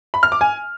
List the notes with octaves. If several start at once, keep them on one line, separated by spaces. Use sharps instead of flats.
B5
F6
D6
G#5